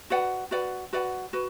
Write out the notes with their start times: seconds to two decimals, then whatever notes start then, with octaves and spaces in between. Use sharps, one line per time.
0.10 F#4 B4 D5 F#5
0.51 F#4 B4 D5 F#5
0.93 F#4 B4 D5 F#5
1.33 F#4 B4